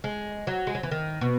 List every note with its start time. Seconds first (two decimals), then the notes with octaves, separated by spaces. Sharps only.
0.04 G#3
0.47 F#3
0.67 G#3
0.75 F#3
0.83 E3
0.91 D#3
1.21 B2